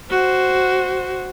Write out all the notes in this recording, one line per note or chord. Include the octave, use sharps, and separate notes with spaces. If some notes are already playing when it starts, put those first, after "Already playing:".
F#4 C5